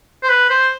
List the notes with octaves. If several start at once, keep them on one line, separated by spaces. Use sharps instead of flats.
C5
B4
C5